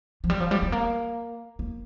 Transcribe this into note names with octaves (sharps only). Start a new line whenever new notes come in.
F3
G3
F3
G3
A3
A#3
A#3